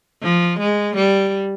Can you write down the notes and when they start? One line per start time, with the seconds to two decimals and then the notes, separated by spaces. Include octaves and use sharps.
0.22 F3
0.59 G#3
0.96 G3